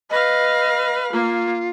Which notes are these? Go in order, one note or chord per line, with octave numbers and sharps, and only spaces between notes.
B4 D#5 F5
A#3 F4